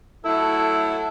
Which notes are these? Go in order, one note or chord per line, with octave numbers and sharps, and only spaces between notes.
F#3 A3 E4 A4 E6